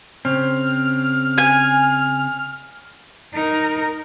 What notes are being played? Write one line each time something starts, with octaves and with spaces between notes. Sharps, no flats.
C#3 C4 F6
G#5
D#4 A#4